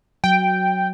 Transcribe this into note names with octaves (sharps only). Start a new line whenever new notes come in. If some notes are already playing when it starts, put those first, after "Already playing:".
F#3 G5